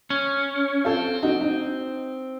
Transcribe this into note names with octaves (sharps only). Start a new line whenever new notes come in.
C#4
C4 F4 A4
D#4 F#4
D#4